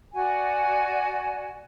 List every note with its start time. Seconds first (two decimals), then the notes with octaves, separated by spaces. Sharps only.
0.14 F#4 D5 F#5 G#5